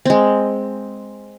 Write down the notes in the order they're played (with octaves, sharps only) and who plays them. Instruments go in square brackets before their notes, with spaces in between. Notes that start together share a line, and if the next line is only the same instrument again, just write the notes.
[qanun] G#3 C4